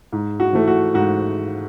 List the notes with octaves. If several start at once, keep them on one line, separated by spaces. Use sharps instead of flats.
G#2
F#4
E3 A3
F#4
G#2 F#4